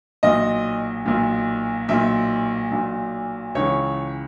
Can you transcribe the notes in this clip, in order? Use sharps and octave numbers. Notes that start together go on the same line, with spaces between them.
B1 A#2 D#5
B1 A#2
B1 A#2 E5
B1 A#2
C#2 C#3 E3 C#5